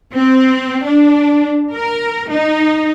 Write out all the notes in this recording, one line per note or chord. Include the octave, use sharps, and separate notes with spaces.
C4
D4
A#4
D#4